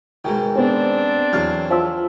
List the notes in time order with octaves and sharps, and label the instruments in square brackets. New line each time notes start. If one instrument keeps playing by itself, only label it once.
[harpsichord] G#2 B2 D#3 [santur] G#4 G5
[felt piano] B3 C5 [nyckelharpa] C4 D4
[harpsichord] E2 F#3 F5 [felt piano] F6
[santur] F3 E5 E6